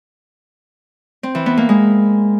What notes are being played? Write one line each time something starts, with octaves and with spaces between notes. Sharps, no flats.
C4
E3
B3
A#3
G#3